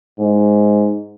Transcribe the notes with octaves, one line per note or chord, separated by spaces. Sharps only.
G#2